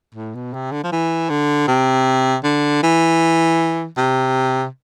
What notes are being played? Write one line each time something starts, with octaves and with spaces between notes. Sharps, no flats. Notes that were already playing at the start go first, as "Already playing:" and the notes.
A2
B2
C3
D3
F3
E3
D3
C3
D3
E3
C3